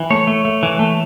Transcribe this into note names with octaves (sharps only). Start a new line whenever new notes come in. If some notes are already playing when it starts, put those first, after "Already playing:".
Already playing: E3
A3 C#5
A3
A3
E3
A3